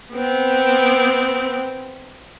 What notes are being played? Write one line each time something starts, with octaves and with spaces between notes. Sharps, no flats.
B3 C4